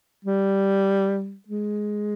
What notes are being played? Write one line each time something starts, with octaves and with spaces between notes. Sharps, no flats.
G3
G#3